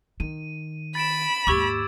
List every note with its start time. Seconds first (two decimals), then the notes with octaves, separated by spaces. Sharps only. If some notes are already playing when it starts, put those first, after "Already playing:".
0.20 D#3 D#7
0.95 B5 A6 D7 E7
1.47 D#2 G#2 G4 C#6 D6 E6 G#6 F#7